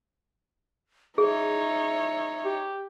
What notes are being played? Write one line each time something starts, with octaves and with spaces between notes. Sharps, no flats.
D#4 G#4 C#5 E5
G4